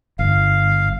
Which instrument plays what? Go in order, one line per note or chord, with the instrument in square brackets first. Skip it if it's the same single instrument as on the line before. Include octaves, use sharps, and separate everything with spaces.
[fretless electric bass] G1 [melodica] F5